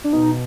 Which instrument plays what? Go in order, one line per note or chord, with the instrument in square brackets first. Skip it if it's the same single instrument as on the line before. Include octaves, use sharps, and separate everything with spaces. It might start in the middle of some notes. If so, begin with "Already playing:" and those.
[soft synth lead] D4
[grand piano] B2 [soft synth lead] D#4